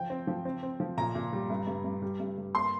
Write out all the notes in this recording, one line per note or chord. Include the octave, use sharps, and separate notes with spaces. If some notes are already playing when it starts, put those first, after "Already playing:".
Already playing: F3 G5
C4
F3
C4
C4
F3
A#2 A#5
A#2
G3
G2
G2
G2
G3
G2
G2
A#3 C6